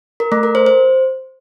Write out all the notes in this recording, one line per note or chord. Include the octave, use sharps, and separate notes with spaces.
A#4
A3
A#4
C5
C5